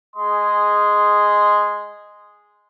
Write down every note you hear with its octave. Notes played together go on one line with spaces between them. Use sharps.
G#3 G#4 D#5 C6